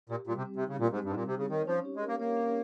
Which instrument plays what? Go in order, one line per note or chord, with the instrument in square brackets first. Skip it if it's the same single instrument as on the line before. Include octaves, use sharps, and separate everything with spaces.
[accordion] A#2 [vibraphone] G4
[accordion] A#2 [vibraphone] G3
[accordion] C3
[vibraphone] C4
[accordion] C3
[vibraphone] D#4
[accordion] C#3
[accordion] A#2 [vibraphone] G4
[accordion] G#2
[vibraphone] G3
[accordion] G2
G#2
[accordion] A#2 [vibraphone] C4
[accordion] C3
[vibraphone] D#4
[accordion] C#3
[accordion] D#3 [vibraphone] C#5
[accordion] F3 [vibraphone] C#4
[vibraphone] G4
[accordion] G#3
[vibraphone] A#4
[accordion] A#3
[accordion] A#3 [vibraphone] C#5
[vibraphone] C#4